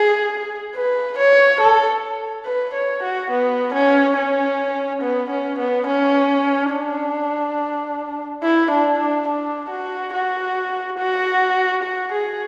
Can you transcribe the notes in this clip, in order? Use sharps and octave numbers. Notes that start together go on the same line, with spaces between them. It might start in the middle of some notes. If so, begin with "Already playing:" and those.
Already playing: G#4
B4
C#5
A4
B4
C#5
F#4
B3
C#4
C#4
B3
C#4
B3
C#4
D4
E4
D4
D4
D4
F#4
F#4
F#4
F#4
G#4